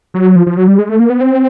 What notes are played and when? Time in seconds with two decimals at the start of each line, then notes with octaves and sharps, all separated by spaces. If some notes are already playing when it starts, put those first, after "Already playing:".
0.14 F#3
0.36 F3
0.47 F3
0.57 F#3
0.68 G3
0.79 G#3
0.89 A3
1.00 A#3
1.10 B3
1.21 C4